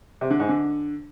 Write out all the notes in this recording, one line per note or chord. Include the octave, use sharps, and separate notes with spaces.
C3
D3
G#2
D3